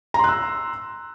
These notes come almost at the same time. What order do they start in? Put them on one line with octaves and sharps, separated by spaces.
A#5 C6 F#6 E6